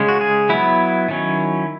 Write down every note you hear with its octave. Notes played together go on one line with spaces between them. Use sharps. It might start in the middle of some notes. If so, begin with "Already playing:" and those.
Already playing: C#3 G#3 C#4
F#4
G#4
F#3 B3 E4
D#3 F#3 C#4